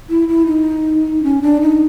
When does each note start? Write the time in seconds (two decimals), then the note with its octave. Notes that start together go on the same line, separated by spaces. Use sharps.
0.10 E4
0.28 E4
0.47 D#4
1.23 C#4
1.42 D4
1.61 D#4